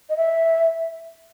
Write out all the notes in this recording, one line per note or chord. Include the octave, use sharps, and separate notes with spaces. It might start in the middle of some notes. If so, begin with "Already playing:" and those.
D#5
E5